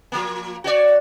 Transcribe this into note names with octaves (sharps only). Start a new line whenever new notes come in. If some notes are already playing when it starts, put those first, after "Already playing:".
F3 A#3
F#4 C#5 D5